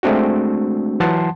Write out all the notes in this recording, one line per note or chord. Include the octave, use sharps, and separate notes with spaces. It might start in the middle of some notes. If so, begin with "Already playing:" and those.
G#3 A3 C4 D4 F#4
E3 F#3 F#5 A5 C6